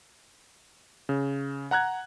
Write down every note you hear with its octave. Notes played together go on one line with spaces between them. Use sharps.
C#3
F#5 A#5 F#6 G#6